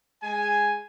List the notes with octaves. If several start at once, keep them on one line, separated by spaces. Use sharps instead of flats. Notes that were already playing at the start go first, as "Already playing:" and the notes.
G#3 G#5